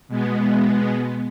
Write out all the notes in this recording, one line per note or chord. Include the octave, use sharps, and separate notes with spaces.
B2 G#3 B3